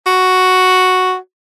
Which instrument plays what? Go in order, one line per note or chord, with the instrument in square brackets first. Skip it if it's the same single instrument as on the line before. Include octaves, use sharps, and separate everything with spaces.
[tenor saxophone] F#4